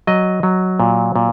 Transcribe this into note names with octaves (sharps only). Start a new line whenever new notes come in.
F#3 D#5
F#3
A#2
A#2